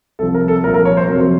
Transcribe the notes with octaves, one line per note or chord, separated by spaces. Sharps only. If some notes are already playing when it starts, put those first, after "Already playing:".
C2 C3 F3 A4
A#4
A4
C2 A#2 F3 A#4
A#4
C#5
C5
F2 C3 F#3 A#4